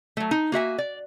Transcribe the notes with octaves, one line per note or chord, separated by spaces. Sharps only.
F#3 A3
D#4
A#3 F#4 E5 G#5
D5